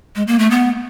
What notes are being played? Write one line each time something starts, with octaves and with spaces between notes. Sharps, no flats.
G#3
A#3
A3
B3